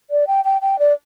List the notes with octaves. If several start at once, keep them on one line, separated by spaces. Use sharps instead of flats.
D5
G5
G5
G5
D5